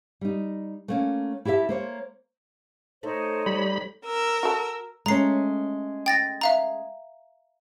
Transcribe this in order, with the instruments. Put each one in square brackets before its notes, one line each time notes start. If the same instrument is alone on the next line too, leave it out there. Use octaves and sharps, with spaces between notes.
[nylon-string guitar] G3 D#4
A3 A#3 C#4
E4 G4 A4 C#5 E5
A#3 C5 C#5
[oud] A3 [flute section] D#4 C5 C#5
[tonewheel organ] G3 B5
[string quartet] A#4 E6
[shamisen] F#4 A4
[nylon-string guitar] G#3 A3 C#4 [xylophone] A#5 C7
[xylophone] G5 A6 A#6
E5 F5 A#5